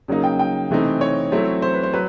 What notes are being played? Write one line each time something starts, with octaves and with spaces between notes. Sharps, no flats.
C#3 F#3 A#3 D#4
G5
G5
C3 E3 A3 C4 D#4
C#5
F#3 A3 C4 E4
C5
B4
C5
F#3 B4